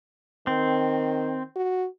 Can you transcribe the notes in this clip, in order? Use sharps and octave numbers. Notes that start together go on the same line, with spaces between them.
D#3 C4
F#4